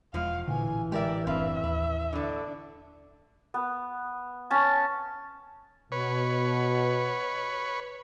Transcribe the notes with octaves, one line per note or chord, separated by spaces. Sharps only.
E1 E2 F3 G#3 F5
A1 A#2 D3 E3 G#5
G#3 G4 A#4 D5 E5
F#1 C4 D4 B4 E5 F5
D#2 B4
A2 D3 D4
B3
C#4 A5
B2 B4 C#5